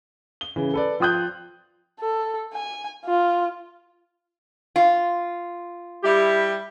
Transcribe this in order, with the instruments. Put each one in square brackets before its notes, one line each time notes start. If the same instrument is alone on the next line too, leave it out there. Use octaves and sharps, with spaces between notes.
[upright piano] G7
C#3 E3
A4 B4 D5
F3 F4 G5 D#6 F#6 G6
[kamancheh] A4
G#5
F4
[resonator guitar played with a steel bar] F4
[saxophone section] G3 E4 G4